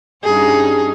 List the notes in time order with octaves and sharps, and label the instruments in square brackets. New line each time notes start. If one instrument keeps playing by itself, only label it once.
[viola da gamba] G2 C#4 D#4 [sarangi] G#4